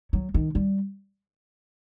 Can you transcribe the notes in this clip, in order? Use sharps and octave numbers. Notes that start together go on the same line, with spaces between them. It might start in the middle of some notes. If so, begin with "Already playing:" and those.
F#3
D#3
G3